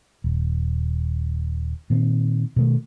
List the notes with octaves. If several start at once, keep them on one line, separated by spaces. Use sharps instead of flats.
D#1
A#2 D#3 C4
B2 D#3 G#3 A3